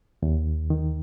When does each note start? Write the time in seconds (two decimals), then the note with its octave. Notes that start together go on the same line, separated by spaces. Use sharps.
0.23 D#2
0.70 D#3